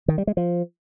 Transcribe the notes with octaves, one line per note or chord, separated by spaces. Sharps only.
D#3
G3
G#3
F3